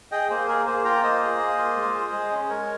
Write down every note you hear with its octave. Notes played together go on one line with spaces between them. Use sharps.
G#4 D#5 G5
A#3 G#4 C5
G#4 A#4
A#3 G#4 C5
F4 G5 A#5
A#3 C5 D#5
G#4
A#3
F4
G#3
G#4
G#3
C#4
G#3 A#4 C#5